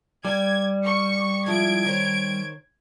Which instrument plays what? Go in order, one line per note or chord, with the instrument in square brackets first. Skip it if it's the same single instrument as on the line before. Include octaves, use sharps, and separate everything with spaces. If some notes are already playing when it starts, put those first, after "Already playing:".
[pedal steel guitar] G3 [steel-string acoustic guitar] D5 [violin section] G#6
[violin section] C#6 C#7
[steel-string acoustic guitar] F3 G#3 E4 [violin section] G#6 D7
[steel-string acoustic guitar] D#3 C5 C#5